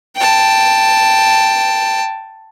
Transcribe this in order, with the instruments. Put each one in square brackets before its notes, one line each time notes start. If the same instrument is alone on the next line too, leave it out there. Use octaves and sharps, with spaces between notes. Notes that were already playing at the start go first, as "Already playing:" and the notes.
[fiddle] G5 A5